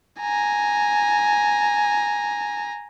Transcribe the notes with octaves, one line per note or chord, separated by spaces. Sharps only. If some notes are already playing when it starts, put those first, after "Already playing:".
G#5 A#5